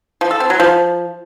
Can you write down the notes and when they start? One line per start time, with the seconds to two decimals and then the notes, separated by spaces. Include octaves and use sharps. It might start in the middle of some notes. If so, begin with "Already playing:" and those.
0.21 F3
0.31 A4
0.40 C4
0.50 F#3
0.60 F3